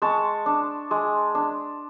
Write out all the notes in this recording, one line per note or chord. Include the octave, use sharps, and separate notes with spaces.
G#3 A5 C#6
D4
G#3
D4